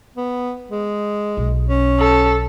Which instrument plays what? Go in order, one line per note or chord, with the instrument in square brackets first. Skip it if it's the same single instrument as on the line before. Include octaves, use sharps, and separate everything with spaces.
[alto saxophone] B3
G#3
[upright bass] B1
[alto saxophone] C#4
[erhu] A4